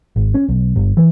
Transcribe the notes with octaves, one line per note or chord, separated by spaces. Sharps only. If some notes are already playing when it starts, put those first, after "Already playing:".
G#1
C#4
B1
G1
E3